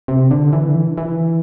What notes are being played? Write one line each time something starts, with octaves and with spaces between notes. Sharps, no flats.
C3
D3
E3
D3
E3
E3